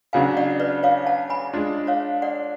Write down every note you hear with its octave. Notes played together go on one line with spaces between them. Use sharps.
C#3 F#3 B3 D4 F5 G#5
D5 F#5
B4 D5
C#5 F5
F#5 A5
G#5 B5
G#3 D4 F4
C#5 F5
D5 F#5